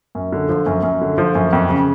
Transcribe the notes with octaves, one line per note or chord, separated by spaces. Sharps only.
F#2
D3
F3
F#2
F#2
D3
F3
F#2
F2
C#3